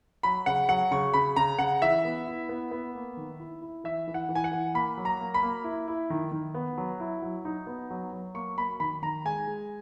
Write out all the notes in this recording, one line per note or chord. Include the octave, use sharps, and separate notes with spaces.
F#3 B5
C#3 F#5
F#3 F#5
C#3 C#6
C#3 B5
C#3 A#5
C#3 F#5
E3 E5
B3
E4
B3
B3
A#3
D#3
E4
E4
E3 E5
E3
F#5
E3
G#5
F#5
E3
A#3 B5
F#3
A#5
A#3
B5
A#3
E4
E4
D#3
D#3
B3
F#3
E4
F#3
D#4
B3
F#3
F#3
A#3 C#6
A#3 B5
D#3 B5
D#3 A#5
G#3 G#5
G#3